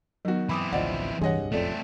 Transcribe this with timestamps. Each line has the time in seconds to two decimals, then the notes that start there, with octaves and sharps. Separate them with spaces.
0.25 D#3 F#3 B3 F#4
0.49 E3 C4 B5 D6 D#6
0.72 A1 D2 F3 D5 D#5 F#5
1.21 D1 C2 G2 G#4 C#5 D#5 F#5 C6
1.52 E1 A1 F2 A3 C4 A4 D5